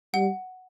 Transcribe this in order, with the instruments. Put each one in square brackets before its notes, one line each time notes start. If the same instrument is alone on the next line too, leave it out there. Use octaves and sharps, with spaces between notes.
[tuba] G3 [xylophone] F#5